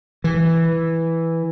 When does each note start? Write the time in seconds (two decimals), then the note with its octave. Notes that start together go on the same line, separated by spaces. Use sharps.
0.24 E3